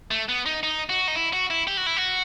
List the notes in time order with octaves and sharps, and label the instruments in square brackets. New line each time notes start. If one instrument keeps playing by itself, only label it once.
[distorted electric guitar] A3
B3
D#4
D#4
F#4
D#4
E4
F#4
E4
G4
F#4
E4
F#4